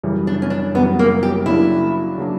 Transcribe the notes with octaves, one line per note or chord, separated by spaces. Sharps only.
F#2 C#3 E3 G3
D4
C#4
D4
F#2 C#3 E3 G3 B3
A#3
G4
C#3 F#3 A#3 D4 E4
C#3 F#3 A#3 D4